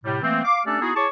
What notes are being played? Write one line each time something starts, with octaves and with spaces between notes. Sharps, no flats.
A2 C3 G3
E3 A3 A#3 C4
F5 D6
A3 C#4 D4 G4 A4 D5
B3 D#4 E4 F#4 G#4
E4 G#4 C#5 A5 C#6 D6